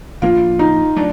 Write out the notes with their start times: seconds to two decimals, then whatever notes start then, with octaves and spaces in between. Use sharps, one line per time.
0.22 A2 F3 A#3 D4 F4
0.59 D#4
0.96 F#3 A3 D4